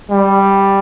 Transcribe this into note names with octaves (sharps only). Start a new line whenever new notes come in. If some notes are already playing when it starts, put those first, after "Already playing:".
G3